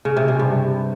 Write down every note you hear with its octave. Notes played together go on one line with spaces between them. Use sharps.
C#3
C3
C3
G2